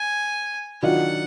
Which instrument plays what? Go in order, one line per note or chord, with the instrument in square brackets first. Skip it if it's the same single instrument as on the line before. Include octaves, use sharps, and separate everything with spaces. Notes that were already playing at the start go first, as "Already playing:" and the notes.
Already playing: [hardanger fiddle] G#5
[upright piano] D#3 F#3 D4 F4 [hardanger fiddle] F#5